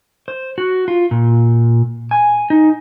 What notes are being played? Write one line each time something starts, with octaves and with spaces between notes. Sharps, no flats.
C5
F#4
F4
A#2
G#5
D#4